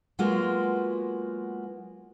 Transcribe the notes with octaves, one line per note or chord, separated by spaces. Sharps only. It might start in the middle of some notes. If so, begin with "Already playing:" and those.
F#3 G#3 A#3 B3 F4 F#4